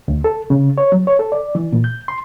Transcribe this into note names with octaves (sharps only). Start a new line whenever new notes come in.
D2
A4
C#3
C#5
F#3
C#5
A4
D5
E3
A#2
G6
C6